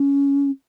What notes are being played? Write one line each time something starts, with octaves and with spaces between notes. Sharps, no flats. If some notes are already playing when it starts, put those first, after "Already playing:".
Already playing: C#4